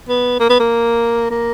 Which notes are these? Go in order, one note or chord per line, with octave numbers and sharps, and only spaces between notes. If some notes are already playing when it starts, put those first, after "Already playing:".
B3
A#3
B3
A#3
A#3